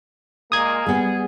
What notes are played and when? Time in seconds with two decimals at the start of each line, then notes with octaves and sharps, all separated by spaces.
0.52 A#2 G#3 A#3 D#6 G#6
0.86 G3 B3 G#4